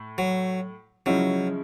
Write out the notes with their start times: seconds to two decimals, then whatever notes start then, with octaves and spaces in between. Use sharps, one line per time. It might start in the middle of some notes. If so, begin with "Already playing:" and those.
Already playing: A2
0.18 F#3
1.06 C#3 F3 F#3 G#3 C#4 E4